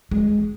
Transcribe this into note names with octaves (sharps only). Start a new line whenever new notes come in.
G#3